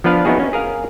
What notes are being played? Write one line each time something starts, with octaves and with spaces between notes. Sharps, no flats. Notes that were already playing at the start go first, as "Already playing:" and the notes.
F3 B3 D4 B4 F5
B3 C#4 D#4 E4 F#4 G#4
C#4
G#4 A#4 F5